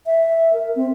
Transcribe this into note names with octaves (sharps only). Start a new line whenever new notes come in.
E5
A#4
C4